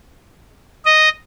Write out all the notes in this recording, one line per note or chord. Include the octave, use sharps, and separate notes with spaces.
D#5